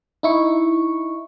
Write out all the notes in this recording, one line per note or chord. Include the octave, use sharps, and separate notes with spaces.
D#4 E4 C#6